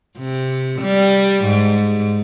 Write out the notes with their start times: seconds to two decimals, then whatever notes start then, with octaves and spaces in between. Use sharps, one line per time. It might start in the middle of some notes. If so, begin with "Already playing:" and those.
0.19 C3
0.81 G3
1.45 G#2